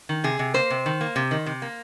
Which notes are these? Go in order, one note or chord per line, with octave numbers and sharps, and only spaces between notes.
D#3
C3 G#4
C3
A#3 C5
C3
D#3
A#3
C3
D#3
C3
A#3